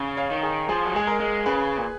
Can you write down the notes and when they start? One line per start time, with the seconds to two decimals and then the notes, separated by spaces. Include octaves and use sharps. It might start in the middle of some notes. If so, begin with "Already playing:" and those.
Already playing: C#3
0.17 C#5 F5
0.30 D#3
0.43 G#4
0.69 F3 G#4
0.85 F#3
0.95 G#3 G#4
1.07 A#4
1.20 G#3
1.46 C#3 G#4 B4
1.77 A#2